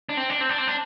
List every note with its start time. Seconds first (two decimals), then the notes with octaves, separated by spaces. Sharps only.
0.09 D4
0.17 C4
0.30 D4
0.41 C4
0.49 D4
0.58 C4
0.67 D4